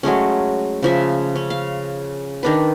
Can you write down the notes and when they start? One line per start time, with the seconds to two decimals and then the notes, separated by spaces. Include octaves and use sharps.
0.03 F#3 G#3 A3 C#4
0.83 C#3 F3 E5
1.36 C#4
1.50 F5
2.43 D#3 D4 B4